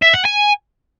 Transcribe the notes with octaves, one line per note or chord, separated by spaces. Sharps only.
E5
F#5
G#5